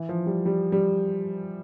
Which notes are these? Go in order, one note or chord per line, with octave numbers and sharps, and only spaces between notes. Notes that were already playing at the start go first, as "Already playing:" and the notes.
Already playing: E3
F3
G3
G3
G3